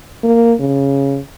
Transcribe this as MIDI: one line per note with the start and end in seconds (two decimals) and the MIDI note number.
0.23 0.53 58
0.60 1.19 49